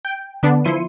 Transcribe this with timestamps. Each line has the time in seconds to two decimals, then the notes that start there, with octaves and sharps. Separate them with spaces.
0.05 G5
0.43 D3 B3 D4
0.65 F3 E4 C6 C#7 D#7